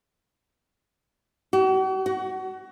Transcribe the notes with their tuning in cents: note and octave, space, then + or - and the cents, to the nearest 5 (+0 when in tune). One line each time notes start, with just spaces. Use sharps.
F#4 +45
F#4 +25